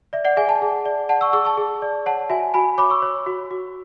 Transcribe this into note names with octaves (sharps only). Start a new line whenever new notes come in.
D5 E5
D5 F#5
G#4 E5 G#5
F#5 A5
G#4
D5
D5 F#5 A5
C#6 E6
G#4 C#6 E6
A5 C#6
G#4
D5
C#5 F#5 A5
F#4 E5 G#5
F#4 G#5 B5
C#5 B5 D6
C#6 E6
C#5
F#4
F#4